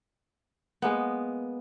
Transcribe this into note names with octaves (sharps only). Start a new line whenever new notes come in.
G#3 A#3 B3